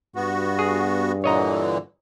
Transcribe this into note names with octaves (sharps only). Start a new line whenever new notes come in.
G2 B3 F#4
G#4
A#2 D3 E3 C#5 D#5 A#5